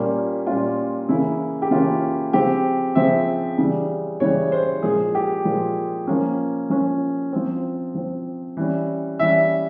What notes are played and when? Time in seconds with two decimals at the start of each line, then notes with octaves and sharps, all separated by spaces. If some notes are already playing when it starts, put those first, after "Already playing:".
Already playing: A#2 G3 A#3 C#4
0.47 A#2 G3 A#3 C#4 F4
1.09 C#3 E3 A#3 C#4 E4
1.62 G4
1.71 C#3 E3 A#3 C#4 F4
2.33 C#3 F3 C4 G4
2.95 C#3 F3 C4 E5
3.58 C#3 E3 G3
4.20 C#3 E3 G3 C#5
4.52 C5
4.83 A#2 F3 G#3 G#4
5.15 G4
5.45 A#2 F3 G#3
6.07 F3 A#3 C#4
6.70 F3 A#3 C#4
7.32 F3 C4
7.95 F3 C4
8.57 E3 G3 C#4
9.19 E3 G3 C#4 E5